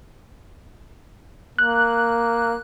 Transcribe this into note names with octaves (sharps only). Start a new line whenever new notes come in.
A#3 F#6